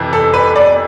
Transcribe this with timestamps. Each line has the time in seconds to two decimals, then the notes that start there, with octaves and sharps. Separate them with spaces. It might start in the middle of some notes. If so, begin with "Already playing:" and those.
Already playing: F2 C3 E3
0.13 A4
0.34 B4
0.56 D5